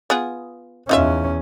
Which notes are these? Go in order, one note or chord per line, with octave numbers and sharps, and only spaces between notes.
B3 F4 G#4
E2 C#4 D#4 F4 E5